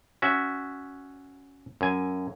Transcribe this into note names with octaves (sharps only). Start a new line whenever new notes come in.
C#4 F#4 E5
F#2 G#5